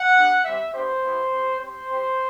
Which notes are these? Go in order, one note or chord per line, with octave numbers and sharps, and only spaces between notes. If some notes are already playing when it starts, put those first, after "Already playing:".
Already playing: F#5
B3 D4 G4
G3 C4 G4 E5
B3 D4 G4 C5
B3 E4 G4
C4 G4
C4 G4 C5
C4 G4